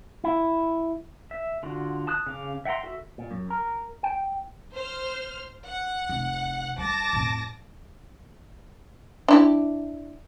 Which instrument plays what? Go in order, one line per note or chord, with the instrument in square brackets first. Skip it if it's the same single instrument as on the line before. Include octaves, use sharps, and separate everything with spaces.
[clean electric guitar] E4
[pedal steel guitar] E5
D3 F4 F#4
A5 D#6 F#6
C#3 F5 D6
E5 F#5 G5 A#5 C6
F#4 A4 E5
[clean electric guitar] A#2
F#2
A#4
G5
[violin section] C5 F6
F#5
[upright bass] F1
[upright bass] G3 [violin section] A5 D6 A#6
[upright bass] F2 A2
[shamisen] D4 E4 G4